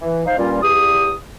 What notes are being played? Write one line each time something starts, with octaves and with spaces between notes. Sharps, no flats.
E3
D#4 C5 F5
G2 A#2 G3 A#3 C#4 F4
E2 G4 D#6